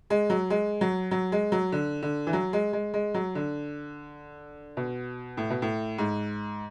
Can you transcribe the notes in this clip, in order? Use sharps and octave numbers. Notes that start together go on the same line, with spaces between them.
G#3
F#3
G#3
F#3
F#3
G#3
F#3
D3
D3
E3
F#3
G#3
G#3
G#3
F#3
D3
B2
A2
B2
A2
G#2